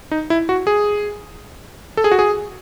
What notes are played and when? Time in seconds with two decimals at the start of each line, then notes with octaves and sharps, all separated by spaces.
0.11 D#4
0.30 E4
0.49 F#4
0.67 G#4
1.97 A4
2.04 G#4
2.11 F#4
2.19 G#4